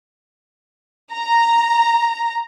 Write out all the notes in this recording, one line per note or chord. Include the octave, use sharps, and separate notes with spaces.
A#5